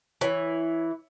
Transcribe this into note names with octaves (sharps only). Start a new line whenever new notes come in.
E3 C#5